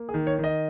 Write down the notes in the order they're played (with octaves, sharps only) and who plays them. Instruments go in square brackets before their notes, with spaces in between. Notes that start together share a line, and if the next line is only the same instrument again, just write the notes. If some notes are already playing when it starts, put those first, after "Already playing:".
Already playing: [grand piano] A#3
G#4
D#3
C#5
D#3
D#5